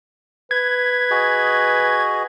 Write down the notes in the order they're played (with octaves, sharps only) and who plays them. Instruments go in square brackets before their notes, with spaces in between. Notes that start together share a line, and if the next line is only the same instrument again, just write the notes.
[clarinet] B4 [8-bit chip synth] G#6
[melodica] F#4 G#4 D#5